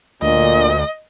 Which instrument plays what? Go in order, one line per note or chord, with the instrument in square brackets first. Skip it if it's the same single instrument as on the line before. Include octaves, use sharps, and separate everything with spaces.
[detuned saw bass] D2 [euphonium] A#2 [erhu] D#5